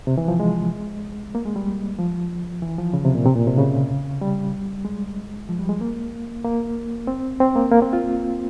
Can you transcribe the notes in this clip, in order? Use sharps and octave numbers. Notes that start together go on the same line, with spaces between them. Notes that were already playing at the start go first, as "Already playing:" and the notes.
C3
E3
F3
G#3
A#3
G#3
G3
F3
E3
F3
C#3
C3
A#2
C3
A#2
C3
C#3
G3
G#3
F3
G3
G#3
A#3
A#3
C4
C4
A#3
A#3
C4
F4